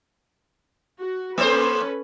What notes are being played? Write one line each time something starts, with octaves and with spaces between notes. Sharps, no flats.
F#4
A#3 C#4 A4 B4 C5